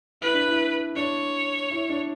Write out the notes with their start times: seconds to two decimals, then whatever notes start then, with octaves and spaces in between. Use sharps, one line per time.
0.21 E4 B4
0.34 D4
0.47 E4
0.96 D4 C#5
1.71 E4
1.89 D4